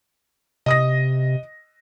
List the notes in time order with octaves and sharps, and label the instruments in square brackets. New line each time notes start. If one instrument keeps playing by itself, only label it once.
[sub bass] C3 [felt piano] D#5 D#6 A#6